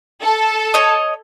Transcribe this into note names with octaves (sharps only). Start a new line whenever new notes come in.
A4
C#5 D#5